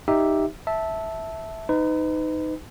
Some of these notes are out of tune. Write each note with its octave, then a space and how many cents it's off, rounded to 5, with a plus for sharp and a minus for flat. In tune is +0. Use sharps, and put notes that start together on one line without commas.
D#4 +0 G4 +0 E5 +0
E5 -10 A5 +0
D#4 +0 B4 +35